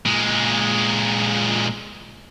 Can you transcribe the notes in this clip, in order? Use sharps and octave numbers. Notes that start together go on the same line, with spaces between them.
A#2 G#3